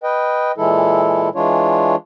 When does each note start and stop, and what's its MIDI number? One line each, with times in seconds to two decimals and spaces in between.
0.03 0.52 71
0.03 0.52 75
0.03 0.52 79
0.58 1.29 46
0.58 1.29 52
0.58 1.29 56
0.58 1.29 64
0.58 1.29 69
1.35 1.96 52
1.35 1.96 56
1.35 1.96 62
1.35 1.96 65
1.35 1.96 73